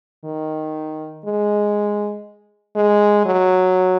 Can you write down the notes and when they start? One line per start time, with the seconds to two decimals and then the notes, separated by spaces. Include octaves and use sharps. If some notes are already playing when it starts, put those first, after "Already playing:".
0.25 D#3
1.25 G#3
2.76 G#3
3.26 F#3